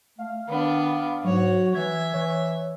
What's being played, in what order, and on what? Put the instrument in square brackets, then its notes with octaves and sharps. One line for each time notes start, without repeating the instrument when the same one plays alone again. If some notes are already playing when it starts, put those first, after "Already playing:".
[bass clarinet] A3 [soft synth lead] F5
[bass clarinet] D#3 [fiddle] B3 D4
[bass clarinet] G#2 [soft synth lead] F#3 [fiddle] F#4 C#5
[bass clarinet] E3 [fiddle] E5 [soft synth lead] G#6
[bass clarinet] E3 [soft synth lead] C#5